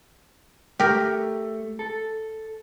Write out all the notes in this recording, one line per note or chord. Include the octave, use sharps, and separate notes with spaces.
A3 G4 A#4
A4